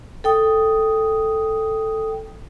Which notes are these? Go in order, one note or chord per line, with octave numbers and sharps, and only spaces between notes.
A4 G5 D#6